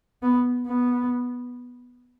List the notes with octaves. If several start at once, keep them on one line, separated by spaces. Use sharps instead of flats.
B3
B3